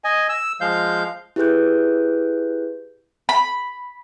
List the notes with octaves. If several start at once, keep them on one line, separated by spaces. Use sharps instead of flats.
D#5 G#5
E6
F3 G#3 F5 G6
E4 G4 G#4 B4 F#6 G6
B5